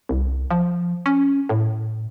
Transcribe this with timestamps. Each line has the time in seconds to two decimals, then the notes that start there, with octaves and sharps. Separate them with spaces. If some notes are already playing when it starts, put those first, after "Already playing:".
0.09 C2
0.51 F3
1.06 C#4
1.49 A2